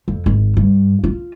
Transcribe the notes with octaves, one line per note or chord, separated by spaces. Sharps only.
F2
G#1
G2
F4